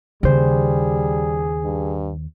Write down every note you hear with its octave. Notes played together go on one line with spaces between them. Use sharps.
D#2 C#3 G3 G#4 C5
G2